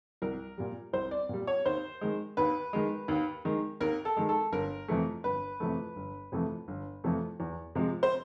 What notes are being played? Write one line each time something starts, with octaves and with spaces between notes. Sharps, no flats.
C2 A#4
A#2 G3
C2 C5
D5
A#2 G3
C#5
D#2 C5
D#3 G#3
D#2 B4
D#3 G#3
D#2
D#3 G#3
D#2 A#4
A4
D#3 G#3
A4
G1 A#4
F2 C3 E3 A3
G1 B4
F2 C3 E3 A3
G1
F2 C3 E3 A3
G1
F2 C3 E3 A3
E2
C3 F3 G#3
C5